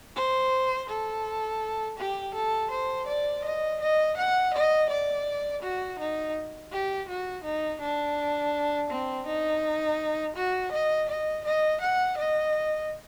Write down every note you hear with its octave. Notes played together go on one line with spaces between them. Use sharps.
C5
A4
G4
A4
C5
D5
D#5
D#5
F#5
D#5
D5
F#4
D#4
G4
F#4
D#4
D4
C4
D#4
F#4
D#5
D#5
D#5
F#5
D#5